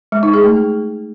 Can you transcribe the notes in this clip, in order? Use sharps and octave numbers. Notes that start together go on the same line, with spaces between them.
G#3
D#4
G#4
A3